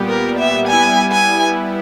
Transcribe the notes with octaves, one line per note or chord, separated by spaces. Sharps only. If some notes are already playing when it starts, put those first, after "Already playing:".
Already playing: A#2 G3 B3 G4
A#4
E5
G3 B3 E4 G#5
G#5